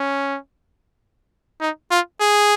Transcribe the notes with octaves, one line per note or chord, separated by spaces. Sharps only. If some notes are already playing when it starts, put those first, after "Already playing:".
Already playing: C#4
D#4
F4
G#4